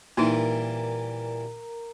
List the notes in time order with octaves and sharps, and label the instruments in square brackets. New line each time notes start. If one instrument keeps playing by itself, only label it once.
[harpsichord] A#2 E3 G3 [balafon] A#3 D#4 E4 [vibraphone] A#4 A#5